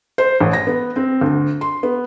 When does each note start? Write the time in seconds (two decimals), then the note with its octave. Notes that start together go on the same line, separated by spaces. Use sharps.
0.18 C5
0.40 A1
0.53 A#6
0.67 B3
0.96 C4
1.21 D2
1.61 C6
1.83 B3